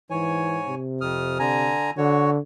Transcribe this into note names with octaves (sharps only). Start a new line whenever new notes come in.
G#2 E3 C#5 G#5
C3
F2 D#6 F6
D3 G#5 A#5
D3 F#4 C#5